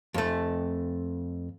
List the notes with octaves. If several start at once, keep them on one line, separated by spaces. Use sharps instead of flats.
F2 A3